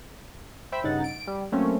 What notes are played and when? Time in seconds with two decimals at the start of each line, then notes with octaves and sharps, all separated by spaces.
0.72 C5 E5 G5 B5
0.83 G2 C#3 D#4 F#5 A6
1.04 D7
1.27 G3
1.52 F#3 A3 A#3 C4 C#4